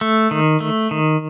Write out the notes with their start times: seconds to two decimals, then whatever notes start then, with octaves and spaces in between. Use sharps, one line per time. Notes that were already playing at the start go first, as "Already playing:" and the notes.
0.01 A3
0.31 D#3
0.60 A3
0.91 D#3